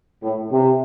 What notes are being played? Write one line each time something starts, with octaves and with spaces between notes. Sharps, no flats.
A2
C3